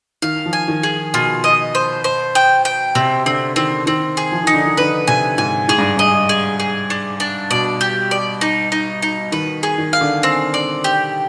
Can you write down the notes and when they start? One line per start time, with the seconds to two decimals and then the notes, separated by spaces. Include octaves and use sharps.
0.22 D#3 F5
0.46 F3
0.53 G#5
0.68 D#3
0.83 G#4
1.14 B2 F4
1.44 D#5
1.75 C5
2.04 C5
2.35 G5
2.65 G5
2.95 C3 C4
3.26 D3 C4
3.56 D#3 C4
3.87 D#3 C4
4.17 G#4
4.32 F3
4.43 D#3 D#4
4.54 D3
4.66 D#3
4.77 D3 B4
5.07 C3 G#5
5.38 G#2 G#5
5.68 G#2 G#4
5.78 G2
5.97 G2 D#5
6.29 G#4
6.60 G#4
6.90 D4
7.20 D4
7.51 B2 D5
7.81 G4
8.11 D5
8.41 D#4
8.72 D#4
9.02 D#4
9.32 D#3 B4
9.63 G#4
9.78 D#3
9.93 F5
10.01 D3
10.23 C4
10.54 D5
10.84 G4